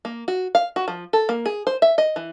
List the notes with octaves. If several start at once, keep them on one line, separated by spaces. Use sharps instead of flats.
A#3
F#4
F5
F#4
F3
A4
A#3
G#4
C5
E5
D#5
E3